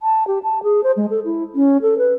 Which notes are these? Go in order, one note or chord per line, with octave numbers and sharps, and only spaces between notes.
A5
G4
A5
G#4
C5
G#3
A4
E4
C#4
A4
B4